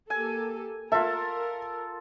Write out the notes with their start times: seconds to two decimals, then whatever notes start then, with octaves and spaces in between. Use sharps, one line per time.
0.10 A#3 G4 A4 G#5
0.92 F4 A4 A#4 E5